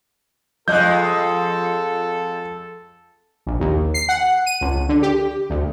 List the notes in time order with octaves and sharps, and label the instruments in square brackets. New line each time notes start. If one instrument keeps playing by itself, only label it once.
[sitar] F2 G#3 [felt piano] F3 D#5 F#6 [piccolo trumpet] A4 [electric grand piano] G6
[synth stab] A#1
D#2
C7
F#5
D#7
C#2
D3
G4
D2